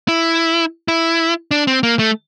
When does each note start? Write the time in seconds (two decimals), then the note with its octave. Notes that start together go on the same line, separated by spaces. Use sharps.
0.08 E4
0.88 E4
1.51 D4
1.67 C4
1.83 A#3
1.99 A3